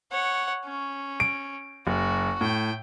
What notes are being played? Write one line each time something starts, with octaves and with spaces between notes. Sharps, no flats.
C#5 F#5
C#4
D7
F#1 F#4
A2 G5